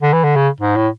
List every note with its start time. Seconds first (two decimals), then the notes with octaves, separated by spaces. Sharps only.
0.02 D3
0.13 E3
0.24 D3
0.36 C#3
0.60 G#2
0.76 A2